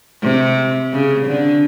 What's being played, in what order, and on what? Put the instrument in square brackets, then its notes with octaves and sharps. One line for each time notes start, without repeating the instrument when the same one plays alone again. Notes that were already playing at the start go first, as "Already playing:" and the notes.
[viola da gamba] C3
C#3
D3